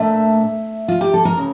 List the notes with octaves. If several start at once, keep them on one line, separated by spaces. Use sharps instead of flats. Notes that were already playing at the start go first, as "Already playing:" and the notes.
Already playing: A#2 A3 D4 E5
F4
G4
A4
A#4
C#3